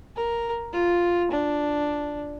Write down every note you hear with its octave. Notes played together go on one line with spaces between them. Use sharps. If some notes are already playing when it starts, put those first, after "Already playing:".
A#4
F4
D4